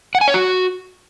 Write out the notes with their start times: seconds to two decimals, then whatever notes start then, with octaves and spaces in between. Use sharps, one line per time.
0.15 F#5
0.21 G#5
0.28 C#5
0.34 F#4